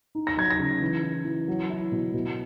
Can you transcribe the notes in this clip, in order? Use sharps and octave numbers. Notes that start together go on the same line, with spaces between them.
D#4
A#6
F#3 G#6
A#6
C#3
E3
E3
E3
F#3
E4
B2
B2